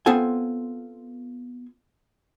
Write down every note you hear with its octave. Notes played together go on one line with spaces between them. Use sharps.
B3 C4 F4 A4 F#5 G#5